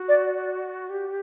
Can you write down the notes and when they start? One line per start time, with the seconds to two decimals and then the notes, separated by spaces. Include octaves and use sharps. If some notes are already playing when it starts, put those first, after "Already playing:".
Already playing: F#4
0.09 D5
0.89 G4